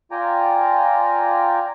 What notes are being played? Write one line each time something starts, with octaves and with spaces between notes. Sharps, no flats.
F4 D5 G5 G#5 A#5